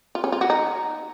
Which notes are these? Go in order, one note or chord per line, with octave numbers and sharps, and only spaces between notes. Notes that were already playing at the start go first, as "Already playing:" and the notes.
F4
C#4
F4
F#4
D#4